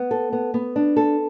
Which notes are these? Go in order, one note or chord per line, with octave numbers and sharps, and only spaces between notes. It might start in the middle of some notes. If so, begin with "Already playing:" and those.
Already playing: B3
A4
B3
B3
D4
A4